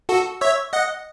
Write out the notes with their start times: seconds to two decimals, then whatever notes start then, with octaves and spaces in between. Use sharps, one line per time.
0.09 F#4 A4
0.41 C#5 E5
0.73 D#5 F#5